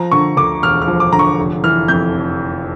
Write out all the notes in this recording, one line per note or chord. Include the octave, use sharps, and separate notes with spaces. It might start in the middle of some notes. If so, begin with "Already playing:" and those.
Already playing: F3 A#5
D3 C#6
D2 D6
E1 F6
F6
F3
D6
D3 A#5
C#6
F1
E3 F6
F2 G6
F1